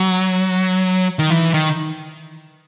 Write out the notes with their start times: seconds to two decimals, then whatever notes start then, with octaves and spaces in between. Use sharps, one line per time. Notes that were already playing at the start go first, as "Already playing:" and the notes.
Already playing: F#3
1.19 D#3
1.30 E3
1.54 D#3